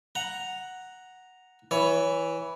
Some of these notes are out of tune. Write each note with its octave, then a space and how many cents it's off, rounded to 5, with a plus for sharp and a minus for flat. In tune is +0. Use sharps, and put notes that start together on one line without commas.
F#5 +0 A#5 +0
E3 +0 C#5 +20